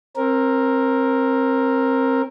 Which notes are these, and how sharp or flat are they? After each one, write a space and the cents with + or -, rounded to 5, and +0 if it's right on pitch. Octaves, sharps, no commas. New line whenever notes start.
C4 +25 A#4 +0